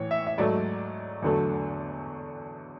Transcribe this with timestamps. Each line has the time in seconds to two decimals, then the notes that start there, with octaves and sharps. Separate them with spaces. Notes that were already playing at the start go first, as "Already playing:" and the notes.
Already playing: A2 E3 C#5
0.11 E5
0.27 E5
0.38 G#2 F#3 A3 D5
1.22 E2 D3 F#3 A3